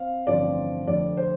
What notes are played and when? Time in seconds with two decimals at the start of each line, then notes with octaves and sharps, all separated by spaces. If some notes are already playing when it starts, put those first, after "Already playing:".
Already playing: C4 F5
0.27 A1 G2 D3 F3 C4 D5
0.87 F1 F2 D3 D5
1.17 C5